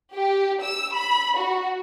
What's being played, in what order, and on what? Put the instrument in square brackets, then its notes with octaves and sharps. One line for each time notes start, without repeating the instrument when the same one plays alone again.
[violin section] G4
E6
B5
F#4